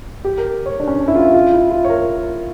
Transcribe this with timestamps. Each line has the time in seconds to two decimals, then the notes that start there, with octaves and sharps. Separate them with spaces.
0.25 G4
0.38 A#4
0.66 C#5
0.80 D4
0.88 C#4
0.94 D4
1.08 E4
1.15 F4
1.24 E4
1.34 F4
1.53 E4
1.71 F4
1.85 C#5
1.90 A#4